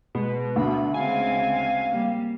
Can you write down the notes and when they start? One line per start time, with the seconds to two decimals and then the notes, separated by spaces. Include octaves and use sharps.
0.15 B2 G#3
0.56 D2 D4 B5
0.94 C#3 G#3 C4 F5 G#5
1.91 G3 A#3